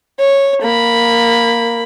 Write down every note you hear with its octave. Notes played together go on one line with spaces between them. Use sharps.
C#5
A#3 B5